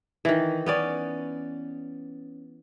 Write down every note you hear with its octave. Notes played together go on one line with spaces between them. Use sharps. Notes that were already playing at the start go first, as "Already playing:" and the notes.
D#3 E3
B3 C#4 D5